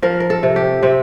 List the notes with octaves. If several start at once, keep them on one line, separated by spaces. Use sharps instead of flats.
F3 A#4
A#4
A4
C3
G4
C3 C4